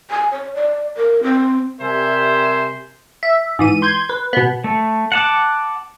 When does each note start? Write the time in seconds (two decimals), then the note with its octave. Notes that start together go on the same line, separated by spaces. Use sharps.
0.10 G#5
0.32 C#5
0.55 D5
0.97 A#4
1.23 C4
1.80 C3 G3 A#4 C5 E5 G#5
3.23 E5
3.59 G#2 E3 D#7
3.82 C6 G6 G#6
4.09 B4
4.33 B2 B3
4.64 A3
5.12 F#5 A5 D6